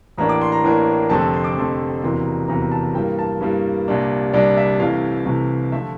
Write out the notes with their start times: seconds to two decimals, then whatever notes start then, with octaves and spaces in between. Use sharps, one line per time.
0.18 A1 A2 E3 A#3 D4 A#5
0.29 D6
0.41 C6
0.52 A#5
0.64 A1 A2 E3 A#3 D4
1.10 F1 F2 D3 A3 C4 A5
1.21 A5
1.34 C6
1.44 D6
1.57 F1 F2 D3 A3 C4
2.02 E1 E2 C3 E3 A#3 C6
2.25 A#5
2.48 E1 E2 C3 E3 A#3 A#5
2.72 A5
2.94 G2 E3 G3 A#3 G5
3.19 A5
3.41 G2 E3 G3 A#3
3.88 C2 A#2 G3 D4
4.33 C2 A#2 G3 D4 D5
4.57 E5
4.80 C2 C3 E3 A3 F5
5.26 C2 C3 E3 A3
5.72 D3 F3 A3 E5